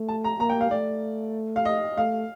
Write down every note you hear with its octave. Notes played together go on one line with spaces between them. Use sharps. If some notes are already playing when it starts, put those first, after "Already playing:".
Already playing: A3
A5
A#5
A#3 A#5
G5
F5
A3 D5
F5
D#5
A3 F5